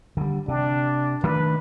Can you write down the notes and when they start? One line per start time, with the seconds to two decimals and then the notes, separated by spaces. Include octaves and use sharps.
0.17 D3 G3
0.48 C3 D4
1.24 D#3 A3 D4 B4